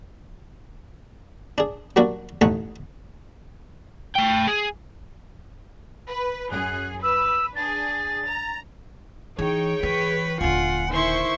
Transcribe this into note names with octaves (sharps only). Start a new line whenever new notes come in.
D4 G#4
F#3 G3 A#3 D4 F#4
A1 A3 D#4 C#5 F#5 G#5
A3 G5
G#4
B4
F#2 G#4 F#6
B4 E6
D4 G#4 A6
A#5
E3 D#4 G#4 C#5 G5
E3 B4
D#1 D3 F4 F#5 G#5
D#3 E4 C5 C6 C#6